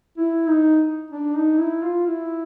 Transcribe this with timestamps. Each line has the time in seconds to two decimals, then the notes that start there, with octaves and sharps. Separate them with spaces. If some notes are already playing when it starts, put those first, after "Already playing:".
0.17 E4
0.48 D#4
1.11 D4
1.35 D#4
1.59 E4
1.83 F4
2.06 E4